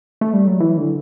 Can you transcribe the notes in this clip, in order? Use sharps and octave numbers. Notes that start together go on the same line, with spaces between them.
A3
G3
F#3
E3
D3